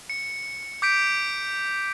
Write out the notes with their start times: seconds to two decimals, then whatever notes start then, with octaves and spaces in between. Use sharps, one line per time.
0.10 C#7
0.82 D6 G6 B6 D7